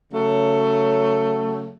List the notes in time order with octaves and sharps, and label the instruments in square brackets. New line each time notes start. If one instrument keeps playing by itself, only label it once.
[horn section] C#3 F#3 A3